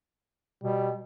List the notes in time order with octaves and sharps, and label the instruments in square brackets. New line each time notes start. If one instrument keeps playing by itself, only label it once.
[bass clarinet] B2 [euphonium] G3